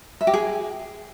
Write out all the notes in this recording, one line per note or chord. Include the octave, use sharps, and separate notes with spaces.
E5
G4
G#4